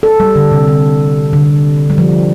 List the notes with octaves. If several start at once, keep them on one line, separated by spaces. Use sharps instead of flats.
A4
G3
D3
C3
D3
D3
G3
F3